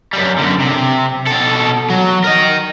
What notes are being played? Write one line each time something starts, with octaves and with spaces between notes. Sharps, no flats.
F#2 G3
F#2 D3
C3
B2 A4
F#3
A#4 D#5